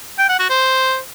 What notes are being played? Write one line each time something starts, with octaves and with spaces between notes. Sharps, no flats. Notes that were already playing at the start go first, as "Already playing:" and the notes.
G5
F#5
F#4
C5